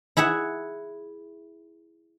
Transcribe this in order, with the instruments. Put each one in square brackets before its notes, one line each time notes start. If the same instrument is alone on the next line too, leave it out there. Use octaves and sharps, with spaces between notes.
[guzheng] E4 G#4 E5 F#5